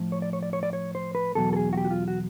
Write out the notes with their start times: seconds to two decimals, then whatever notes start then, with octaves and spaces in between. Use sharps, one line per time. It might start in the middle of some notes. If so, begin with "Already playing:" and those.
Already playing: A2 F3
0.12 C#5
0.22 D5
0.33 C#5
0.43 D5
0.53 C#5
0.63 D5
0.73 C#5
0.95 C5
1.15 B4
1.35 E2 B2 F#3 A4
1.53 A4
1.56 G#4
1.73 F#4
1.77 G4
1.85 F#4
1.91 F4
2.08 F#4